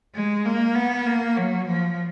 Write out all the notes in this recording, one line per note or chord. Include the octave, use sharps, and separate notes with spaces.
G#3
A#3
B3
A#3
F#3
F3